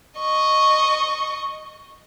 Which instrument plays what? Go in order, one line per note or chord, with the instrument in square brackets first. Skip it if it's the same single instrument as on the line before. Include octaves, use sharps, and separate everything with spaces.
[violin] D#5 C#6